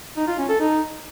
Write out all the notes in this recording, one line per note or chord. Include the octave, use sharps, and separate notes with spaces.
D#4
F4
C#4
A4
D#4